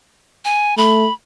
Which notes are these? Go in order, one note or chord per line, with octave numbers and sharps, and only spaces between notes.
G#5
A3 B5